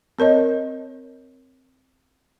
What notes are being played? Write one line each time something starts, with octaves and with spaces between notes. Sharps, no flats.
C4 A#4 C#5 D#5